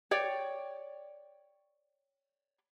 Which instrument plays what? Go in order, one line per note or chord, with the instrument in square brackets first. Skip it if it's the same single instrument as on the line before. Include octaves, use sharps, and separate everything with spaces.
[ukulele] C#5 D5 G5